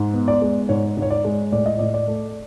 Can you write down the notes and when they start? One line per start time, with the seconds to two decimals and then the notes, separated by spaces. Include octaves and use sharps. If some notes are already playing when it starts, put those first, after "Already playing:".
Already playing: G#2
0.13 B3
0.28 D5
0.42 G#3
0.69 G#2 C#5
0.97 G#2
1.02 C#5
1.10 D5
1.25 G#3
1.52 A2 D5
1.66 D#5
1.79 A2 D5
1.94 D5
2.08 A3